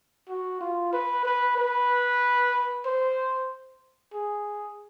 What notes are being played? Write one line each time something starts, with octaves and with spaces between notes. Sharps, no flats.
F#4
F4
B4
B4
B4
C5
G#4